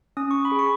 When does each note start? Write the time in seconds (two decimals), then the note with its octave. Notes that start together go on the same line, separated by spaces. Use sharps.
0.17 C#4 D#6
0.31 C#6
0.45 B5
0.52 G#4
0.59 C#6